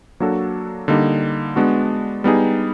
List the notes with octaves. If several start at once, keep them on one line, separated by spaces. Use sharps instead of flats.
F#3 A#3 D4 F#4 A4
D3 G3 A#3 D#4
G#3 B3 D4 F#4
G3 B3 D#4 G#4